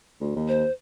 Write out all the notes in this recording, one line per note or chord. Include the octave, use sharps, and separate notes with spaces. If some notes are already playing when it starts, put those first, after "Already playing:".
D2
D#2
C5